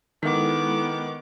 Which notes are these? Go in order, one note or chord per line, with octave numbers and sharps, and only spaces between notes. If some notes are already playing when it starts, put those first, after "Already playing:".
D#3 G#3 B3 E4 A4 D6